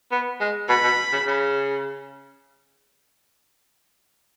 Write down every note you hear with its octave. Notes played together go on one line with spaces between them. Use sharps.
B3
G#3
B2 B5
B2
C#3
C#3